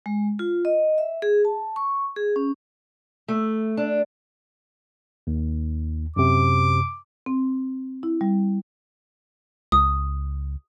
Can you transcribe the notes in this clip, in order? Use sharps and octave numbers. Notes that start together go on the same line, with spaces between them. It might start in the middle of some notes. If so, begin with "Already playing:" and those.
G#3
F4
D#5
E5
G#4
A5
C#6
G#4
C#4
A3
D4
D#2
F#2 C3 D6
C4
E4
G3
C#2 D#6